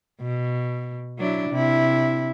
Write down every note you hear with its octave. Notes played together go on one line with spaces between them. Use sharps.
B2
F#3 D4 E4
C3 E4